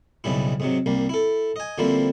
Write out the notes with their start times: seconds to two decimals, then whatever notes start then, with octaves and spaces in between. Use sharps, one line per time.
0.24 B1 G#2 C#3 G3 E4
0.60 G#2 C3 F#3
0.86 C2 G3 A#3
1.09 E4 A4
1.56 D#5 G#5
1.78 D3 F3 G3 A#3 C4 E4